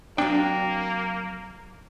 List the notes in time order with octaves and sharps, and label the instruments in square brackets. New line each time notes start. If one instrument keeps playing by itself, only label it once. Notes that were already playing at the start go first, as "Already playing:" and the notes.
[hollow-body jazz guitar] F#3 C4 G5 [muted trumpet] A#3 [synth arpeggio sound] D4